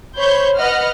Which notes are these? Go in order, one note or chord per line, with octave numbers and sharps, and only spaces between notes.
C5 C#5 B5 G6
B4 D#5 F#5 F6